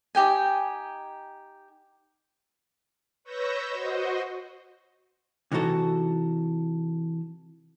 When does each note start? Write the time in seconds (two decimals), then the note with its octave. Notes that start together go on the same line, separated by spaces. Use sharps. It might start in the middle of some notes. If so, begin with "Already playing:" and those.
0.15 D#4 G4 G5 G#5
3.24 B4 C#5 C#6 E6 G6 A#6
3.68 F#4 C5 D#5
5.52 C3 E3 D#4 F#4 A4